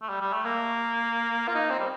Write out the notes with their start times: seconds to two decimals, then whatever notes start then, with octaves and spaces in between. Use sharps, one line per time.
0.02 A3
0.09 G3
0.21 G3
0.33 A3
0.45 A#3
1.48 F4
1.55 D#4
1.70 C4
1.79 G3